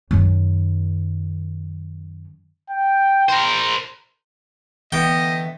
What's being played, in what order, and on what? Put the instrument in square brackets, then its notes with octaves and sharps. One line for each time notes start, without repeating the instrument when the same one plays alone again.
[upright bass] F#2 D#3
[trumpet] G5
[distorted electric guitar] A#4 C5
[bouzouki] D3 A3 B3 [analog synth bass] E3 [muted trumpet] D#5 [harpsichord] G5